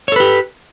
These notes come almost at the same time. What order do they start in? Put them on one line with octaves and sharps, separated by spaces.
C#5 A4 B4 G4